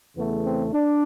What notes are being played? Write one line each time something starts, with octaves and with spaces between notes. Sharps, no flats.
E2 C#3 E3 A3 B3
C4
D4